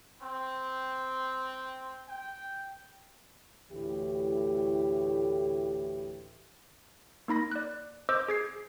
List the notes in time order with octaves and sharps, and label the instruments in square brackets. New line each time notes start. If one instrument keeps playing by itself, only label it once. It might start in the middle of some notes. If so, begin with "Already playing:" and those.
[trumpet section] C4
G5
[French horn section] D2 A2 E3 E4 G4
[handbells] A#3 D#4 B5 A#6
D5 F#6
C5 D#5 D6 E6 G6
G#4 G#6 C7